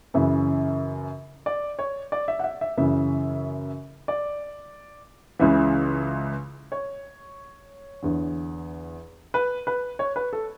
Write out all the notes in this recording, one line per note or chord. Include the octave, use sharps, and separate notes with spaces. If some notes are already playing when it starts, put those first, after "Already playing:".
F#2 C#3 E3 E5
D5
C#5
D5
E5
F#5
E5
E5
F#2 C#3 E3 E5
D5
C#2 C#3 E3 E5
C#5
E2 D3
B4
B4
C#5
B4
A4